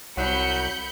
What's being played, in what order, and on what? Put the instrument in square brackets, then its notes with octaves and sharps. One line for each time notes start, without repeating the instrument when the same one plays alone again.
[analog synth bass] C2 [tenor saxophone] F#3 [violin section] B5 G6 C#7